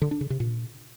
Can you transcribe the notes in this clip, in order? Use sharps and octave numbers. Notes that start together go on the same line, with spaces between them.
D3
D4
C#3
C3
A#2